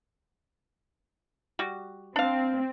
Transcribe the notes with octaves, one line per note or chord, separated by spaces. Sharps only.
G3 F#4
C4 D4 F5